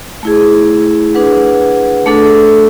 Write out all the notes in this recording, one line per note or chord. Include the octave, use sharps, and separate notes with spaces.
A3 E4 G#4
D4 G#4 B4 F#5
A3 D4 A4